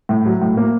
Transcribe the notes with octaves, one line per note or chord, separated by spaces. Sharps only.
A2
F#3
A2
A#3